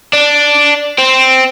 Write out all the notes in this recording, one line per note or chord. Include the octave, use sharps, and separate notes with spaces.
D4
C4